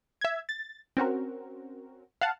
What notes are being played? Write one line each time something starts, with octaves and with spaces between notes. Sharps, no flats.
E5 G#6
A6
C4 C#4 F#4 A#4
F5 F#5 A5